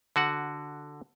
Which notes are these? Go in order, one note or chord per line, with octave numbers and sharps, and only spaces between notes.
D3 F#4 F#5